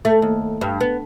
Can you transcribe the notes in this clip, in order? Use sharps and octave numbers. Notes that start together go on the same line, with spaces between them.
A3
D#2
G2
B3